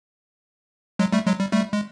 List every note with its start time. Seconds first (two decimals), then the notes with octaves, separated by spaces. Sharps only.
0.99 F#3 G#3
1.12 G3 A3
1.26 F#3 G#3
1.39 G3
1.53 G3 A3
1.73 G#3